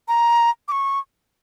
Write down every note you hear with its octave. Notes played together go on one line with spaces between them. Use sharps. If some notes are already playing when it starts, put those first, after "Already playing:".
A#5
D6
C#6